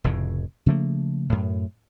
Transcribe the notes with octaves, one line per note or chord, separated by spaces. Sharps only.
F1 F2 A2 C#3
C#3 F3 A3 A#3
F#2 A2